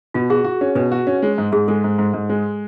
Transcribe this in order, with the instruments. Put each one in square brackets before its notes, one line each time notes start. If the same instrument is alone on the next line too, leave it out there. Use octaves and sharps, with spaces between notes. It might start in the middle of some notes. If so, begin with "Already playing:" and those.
[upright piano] B2 [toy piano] F4
[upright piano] F#4 [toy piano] G#4
[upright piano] F#4
C#4
[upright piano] B2 [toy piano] B4
[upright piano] F#4
C#4
G#3
G#2
[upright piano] G#2 [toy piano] G#4
[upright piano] G#3 [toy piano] A4
[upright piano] G#2
G#2
G#2
G#3